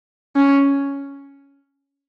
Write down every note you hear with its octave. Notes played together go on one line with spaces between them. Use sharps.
C#4